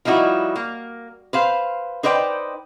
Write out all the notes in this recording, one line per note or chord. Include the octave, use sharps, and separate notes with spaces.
F3 G3 D#4 E4 F#4
A#3
B4 C5 F5
D#4 B4 C5 D5 F5 G5